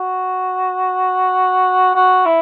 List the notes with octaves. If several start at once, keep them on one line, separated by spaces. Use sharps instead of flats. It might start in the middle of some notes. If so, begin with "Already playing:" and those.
Already playing: F#4
F#4
E4